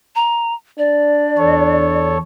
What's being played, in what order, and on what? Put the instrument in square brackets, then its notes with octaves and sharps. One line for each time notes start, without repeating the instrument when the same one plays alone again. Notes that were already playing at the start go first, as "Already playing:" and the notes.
[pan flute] A#5
[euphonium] D4 [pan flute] D5
[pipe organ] E2 A4 C#5